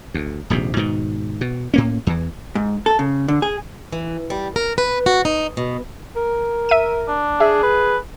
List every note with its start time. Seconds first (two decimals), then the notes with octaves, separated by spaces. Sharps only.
0.14 D2
0.50 D#1 A#1 G#2 C3
0.77 G#2 B2 D#3
1.41 B2
1.74 A2 A#3 C#4
2.07 E2 E3
2.55 G#2
2.86 A4
2.99 C#3
3.28 D3
3.42 G#4
3.92 E3
4.30 G3
4.56 A#4
4.78 B4
5.06 F#4
5.25 D#4
5.57 B2
6.16 A#4
6.69 E5 D#7
7.08 D4
7.40 G#4 E5
7.63 B4